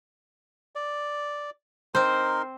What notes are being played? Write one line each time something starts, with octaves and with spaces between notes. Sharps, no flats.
D5
C4 D#4 A#4 C5 C6